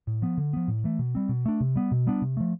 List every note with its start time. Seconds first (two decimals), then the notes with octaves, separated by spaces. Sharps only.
0.07 A2
0.22 F3 B3
0.38 D3
0.53 F3 B3
0.68 A2
0.84 E3 A3
0.99 B2
1.15 G3 C4
1.29 B2
1.46 A3 D4
1.60 C3
1.76 G3 B3
1.92 B2
2.07 G3 B3 D4
2.22 C3
2.37 F3 A3